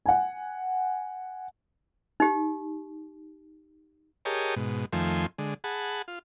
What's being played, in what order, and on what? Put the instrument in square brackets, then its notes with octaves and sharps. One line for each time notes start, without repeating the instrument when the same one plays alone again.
[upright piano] F#5 G#5
[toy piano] D#4 G4
[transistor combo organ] G4 G#4 A#4 C#5 D#5 A5
G#2 B2
F2 D#3 F3 A3 C5 G#5
D3 G#3
G#4 F#5 A5 B5
F4